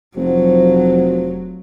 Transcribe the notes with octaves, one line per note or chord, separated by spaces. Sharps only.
F1 F3 F#3 F#4 C5